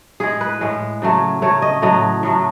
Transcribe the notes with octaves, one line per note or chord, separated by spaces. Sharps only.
A2 G#3 G#4
B4
A2 G#3
C#3 F#3 A3
C#3 F#3 A3 C#5
D#5
A2 F#3 A3 D#5
A2 F#3 A3